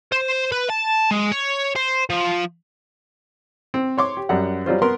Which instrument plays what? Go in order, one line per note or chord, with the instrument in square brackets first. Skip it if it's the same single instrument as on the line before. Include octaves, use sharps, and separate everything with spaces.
[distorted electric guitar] C5
B4
A5
G#3
C#5
C5
F3
[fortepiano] C4
C#5 C6 D6
G4
F#2 G3 F#5
F#3 G3 F4 C5
B3 A#4 C6